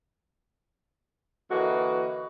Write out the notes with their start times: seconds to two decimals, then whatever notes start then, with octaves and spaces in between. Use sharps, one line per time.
1.50 D3 E3 A#3 F#4 D#5